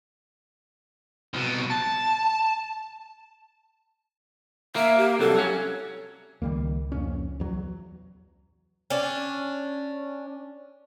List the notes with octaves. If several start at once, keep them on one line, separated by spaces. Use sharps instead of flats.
C2 B2
A5
A#3 E5
G4
C2 F#3 A4
F#3 C#4
C#2 D#3 G3 A#3
F2 A#2 C#4
E2 F#3
C#4 D4